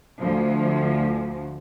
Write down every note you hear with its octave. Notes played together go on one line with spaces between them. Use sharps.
D2 F3